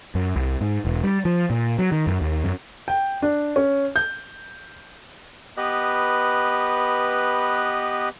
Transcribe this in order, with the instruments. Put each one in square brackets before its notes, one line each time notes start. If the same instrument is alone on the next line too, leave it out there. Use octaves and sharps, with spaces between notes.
[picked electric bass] F#2
C2
G#2
E1
G3
F3
A#2
F#3
D#3
F#2
D#2
F#2
[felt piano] G5
D4
C#4
G6
[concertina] B3 G4 B4 D#5 F#6